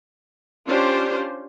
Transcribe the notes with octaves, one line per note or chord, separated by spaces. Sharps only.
C#4 D4 F4 G4 C5